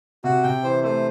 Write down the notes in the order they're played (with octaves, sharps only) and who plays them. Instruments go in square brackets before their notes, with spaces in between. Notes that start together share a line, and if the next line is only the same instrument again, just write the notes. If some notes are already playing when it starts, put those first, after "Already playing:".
[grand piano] C3 [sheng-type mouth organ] F#4
[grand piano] C3 [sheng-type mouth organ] G5
[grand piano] E3 [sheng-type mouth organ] C5
[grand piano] A3 [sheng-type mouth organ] C5